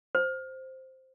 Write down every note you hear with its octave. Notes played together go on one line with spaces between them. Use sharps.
C5